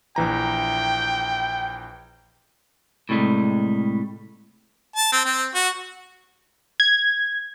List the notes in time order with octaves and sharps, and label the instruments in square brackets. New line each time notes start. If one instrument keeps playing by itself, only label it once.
[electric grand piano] A#1 E3 A#5 [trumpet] G5
[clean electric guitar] A2 C3 G3 G#3
[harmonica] A5
C4
C4
F#4
[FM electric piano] G#6